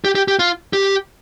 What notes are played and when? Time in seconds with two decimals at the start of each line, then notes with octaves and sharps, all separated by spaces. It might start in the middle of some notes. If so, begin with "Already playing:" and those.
0.05 G4
0.15 G4
0.28 G4
0.39 F4
0.73 G4